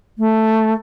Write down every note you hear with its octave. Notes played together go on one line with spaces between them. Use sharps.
A3